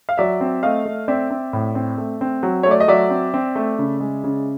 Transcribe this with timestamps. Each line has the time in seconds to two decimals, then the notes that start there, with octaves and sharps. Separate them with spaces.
0.09 F5
0.17 F#3 D5 E5
0.41 C4
0.63 A3 D#5 F5
0.86 A3
1.08 C4 D5 E5
1.31 C4
1.53 A2
1.75 C4
1.98 A3
2.21 C4
2.43 F#3
2.63 A3 C#5
2.71 D5
2.80 D#5
2.88 F#3 D5 E5
3.10 C4
3.34 C4
3.56 A3
3.79 C#3
4.00 G#3
4.24 C#3